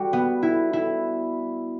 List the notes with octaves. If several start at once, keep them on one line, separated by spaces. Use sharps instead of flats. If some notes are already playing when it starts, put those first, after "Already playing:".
Already playing: G3 F#4
B3
E4
E4